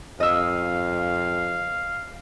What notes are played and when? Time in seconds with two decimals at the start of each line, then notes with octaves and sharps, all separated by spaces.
0.20 F2 D#5 F5 E6